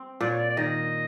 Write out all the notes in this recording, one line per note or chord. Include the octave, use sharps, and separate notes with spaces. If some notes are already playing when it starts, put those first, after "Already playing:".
Already playing: C4
A#2 D5
C#5
D5
D5
D#3 D#5